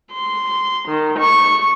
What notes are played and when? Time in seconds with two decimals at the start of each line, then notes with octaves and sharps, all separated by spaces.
0.12 C6
0.89 D#3
1.18 C#6